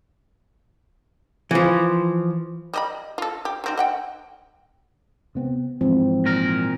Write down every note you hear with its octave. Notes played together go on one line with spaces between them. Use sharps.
E3 F3
G3 D#5 B5
F4 A4
G4
F#3 C4 D#4
D#5 F#5 G5
C3 B3 C4
G#2 E3 F3 C4
A#2 A#4